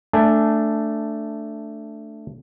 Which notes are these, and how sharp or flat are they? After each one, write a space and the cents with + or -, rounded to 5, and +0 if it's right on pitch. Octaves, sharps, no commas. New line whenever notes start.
A3 +5 D4 +0 G#5 +0